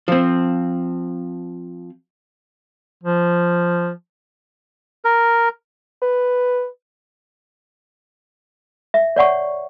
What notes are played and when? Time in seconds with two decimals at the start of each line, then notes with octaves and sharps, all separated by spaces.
0.08 F3 C4
3.04 F3
5.05 A#4
6.02 B4
8.94 E5
9.16 C#5 D5 F#5 C#6